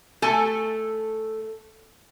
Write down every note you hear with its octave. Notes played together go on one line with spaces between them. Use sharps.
A3 A4 G#5